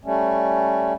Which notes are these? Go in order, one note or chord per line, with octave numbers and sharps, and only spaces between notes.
G3 A3 C#4